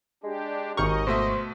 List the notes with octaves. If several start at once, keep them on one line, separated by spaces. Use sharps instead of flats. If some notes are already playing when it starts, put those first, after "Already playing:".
G#3 D4 G4
G#1 D#2 D#5 A#5 C#6 F6 G6
B2 A3 C5 E5